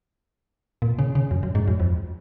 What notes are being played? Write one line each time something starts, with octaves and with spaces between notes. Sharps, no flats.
A#2
C#3
C#3
F#2
F#2
G#2
F#2
F2